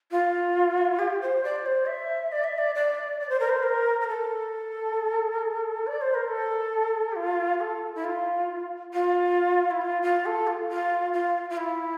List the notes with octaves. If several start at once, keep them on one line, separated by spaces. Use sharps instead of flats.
F4
G4
C5
D5
C5
E5
D5
E5
D5
D5
D5
C5
A#4
C5
A#4
A#4
A4
D5
C5
A#4
A4
G4
F4
A4
E4
F4
F4
E4
F4
F4
A4
F4
F4
F4
F4
E4